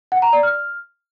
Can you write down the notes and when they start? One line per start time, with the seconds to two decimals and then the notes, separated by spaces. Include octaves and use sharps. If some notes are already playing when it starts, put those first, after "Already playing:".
0.12 F#5
0.22 A#5
0.33 D5
0.43 F6